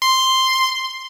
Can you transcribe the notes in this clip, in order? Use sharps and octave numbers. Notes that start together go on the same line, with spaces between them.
C6